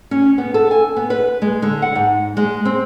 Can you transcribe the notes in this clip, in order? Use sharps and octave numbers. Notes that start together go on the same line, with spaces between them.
C#4
B3
A4
G#5
B3
B4
G#3
D3
F#5
G#2
G#3
C4